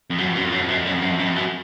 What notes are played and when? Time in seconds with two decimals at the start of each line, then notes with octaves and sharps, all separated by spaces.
0.10 F2
0.18 F#2
0.27 F2
0.36 F#2
0.44 F2
0.52 F#2
0.61 F2
0.69 F#2
0.77 F2
0.86 F#2
0.93 F2
1.02 F#2
1.10 F2
1.19 F#2
1.27 F2
1.36 F#2